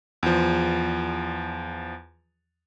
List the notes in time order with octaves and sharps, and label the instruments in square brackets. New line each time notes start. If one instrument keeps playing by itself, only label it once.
[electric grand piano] E2 F3